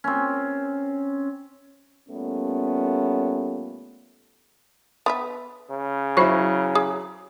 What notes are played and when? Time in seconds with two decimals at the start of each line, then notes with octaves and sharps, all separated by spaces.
0.04 C4 C#4
2.09 A#2 G3 A3 B3 C#4
5.06 B3 B4 E5
5.70 C#3
6.17 F#3 E4 C5 B5 C#6
6.75 G#4